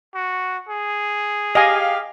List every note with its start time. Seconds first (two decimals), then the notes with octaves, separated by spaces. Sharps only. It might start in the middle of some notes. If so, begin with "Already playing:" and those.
0.15 F#4
0.69 G#4
1.55 G4 D#5 F5 G#5